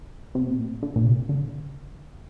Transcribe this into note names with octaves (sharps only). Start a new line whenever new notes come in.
C3
A#2
A2
A#2
D3
A#2
C3
D3